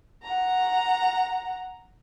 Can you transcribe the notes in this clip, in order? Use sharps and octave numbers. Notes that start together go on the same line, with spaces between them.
F#5 A#5